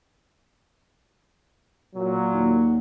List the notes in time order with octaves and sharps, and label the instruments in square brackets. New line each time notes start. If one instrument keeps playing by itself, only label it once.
[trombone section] A#2 F#3
[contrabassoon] D#2